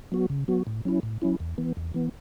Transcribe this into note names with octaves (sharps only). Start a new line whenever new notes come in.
F#3 B3 F#4
C#3
F#3 B3 F#4
A2
F#3 C#4 E4
A2
F#3 C#4 E4
E2
E3 B3
E2
E3 B3